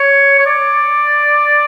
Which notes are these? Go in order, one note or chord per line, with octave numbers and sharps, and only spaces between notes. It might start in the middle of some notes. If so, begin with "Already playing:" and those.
Already playing: C#5
C#5
D5